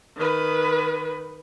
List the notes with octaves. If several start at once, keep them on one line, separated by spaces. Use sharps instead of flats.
D#3 B4